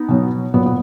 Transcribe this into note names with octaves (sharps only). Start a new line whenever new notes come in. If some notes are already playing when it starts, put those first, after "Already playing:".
Already playing: B3 D#4
B2 F#3
A#2 F#3 B3
B3